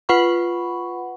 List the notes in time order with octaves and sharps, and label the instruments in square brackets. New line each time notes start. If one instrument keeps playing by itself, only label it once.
[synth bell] F4 B4 F#5 B5 C#6